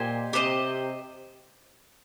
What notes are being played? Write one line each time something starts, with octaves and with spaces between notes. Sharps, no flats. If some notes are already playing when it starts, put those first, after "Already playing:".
Already playing: A#2 G4 C5 D#5 G#5
C3 G4 C5 D#5